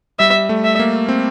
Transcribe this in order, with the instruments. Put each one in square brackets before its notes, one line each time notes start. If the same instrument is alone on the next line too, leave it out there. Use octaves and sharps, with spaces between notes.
[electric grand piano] G3 [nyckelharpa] E5
[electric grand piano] A3
[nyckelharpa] E5
[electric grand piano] A#3
C4